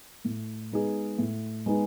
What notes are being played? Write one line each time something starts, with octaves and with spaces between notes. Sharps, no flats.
A2
G#3 B3 D#4 G#4
A2
G#3 B3 D#4 G#4